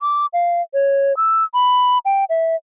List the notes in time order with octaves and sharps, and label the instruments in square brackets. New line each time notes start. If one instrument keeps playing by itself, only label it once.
[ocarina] D6
F5
C#5
E6
B5
G5
E5